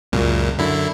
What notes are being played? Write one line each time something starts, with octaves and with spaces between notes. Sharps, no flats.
C#2 F#2 A#2
F#2 D3 E4